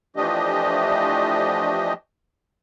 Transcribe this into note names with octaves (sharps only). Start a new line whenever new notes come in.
E3 F3 A3 D4 G4 D#5